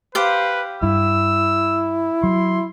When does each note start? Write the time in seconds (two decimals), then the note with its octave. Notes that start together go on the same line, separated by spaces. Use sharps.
0.15 G4 B4 C5 F5
0.83 G2 E4 E6
2.23 F#3 C6